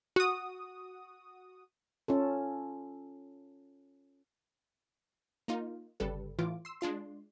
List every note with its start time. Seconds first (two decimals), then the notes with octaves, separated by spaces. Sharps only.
0.16 F#4 D#6
2.08 C#4 F4 A4
5.48 A#3 D#4 F4
6.00 G1 C#3 G3 A4 B4
6.39 A2 E3 F4 D6
6.65 C6 E6
6.81 G#3 D4 F4 C6